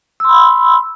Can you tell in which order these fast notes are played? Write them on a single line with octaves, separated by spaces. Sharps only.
E6 C6 B5